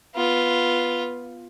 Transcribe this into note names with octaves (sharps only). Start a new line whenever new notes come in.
B3 F4